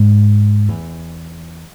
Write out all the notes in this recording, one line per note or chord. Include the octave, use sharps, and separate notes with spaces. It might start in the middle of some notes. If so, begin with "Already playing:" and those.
Already playing: G#2
E2